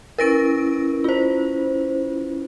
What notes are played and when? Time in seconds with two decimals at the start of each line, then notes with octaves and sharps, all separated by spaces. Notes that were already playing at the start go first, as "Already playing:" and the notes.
0.18 C#4 E4 A#4 B4 A#6 D7
1.04 F4 C5